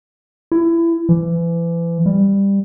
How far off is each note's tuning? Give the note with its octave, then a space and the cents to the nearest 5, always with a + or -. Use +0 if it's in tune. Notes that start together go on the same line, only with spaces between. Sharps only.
E4 +25
E3 +35
G3 +15